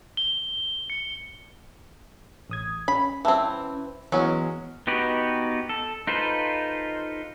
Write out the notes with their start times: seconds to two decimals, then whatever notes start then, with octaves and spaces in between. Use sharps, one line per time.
0.17 G7
0.90 C#7
2.50 A1 D#6 G#6
2.88 C#4 B5
3.25 E3 C4 E5 A5 E6
4.12 E3 F#3 G#3 B3 C#4
4.87 B3 D#4 F#4 G4 B4
5.69 A4
6.07 D#4 F4 A4 B4 C5